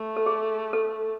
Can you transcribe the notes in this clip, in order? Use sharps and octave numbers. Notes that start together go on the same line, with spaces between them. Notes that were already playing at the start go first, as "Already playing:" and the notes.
Already playing: A3
A4
G#4
A4